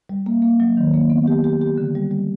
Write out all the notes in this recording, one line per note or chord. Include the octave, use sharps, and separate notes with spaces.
G3
A#3
A#3
F#3
D#3
A#3
B3
G4
G4
G4
D3
G3
G3